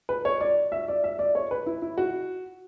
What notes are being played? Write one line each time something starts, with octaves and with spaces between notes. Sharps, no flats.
B4
C#5
D5
E5
D5
E5
D5
C#5
B4
E4
E4
F#4